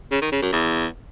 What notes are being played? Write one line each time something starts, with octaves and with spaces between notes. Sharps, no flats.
C#3
D#3
C#3
F#2
E2